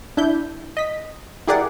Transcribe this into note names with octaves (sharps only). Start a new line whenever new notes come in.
D4 E4 G6
D#5 B6
E4 G4 G#4 A#4 D5 F#5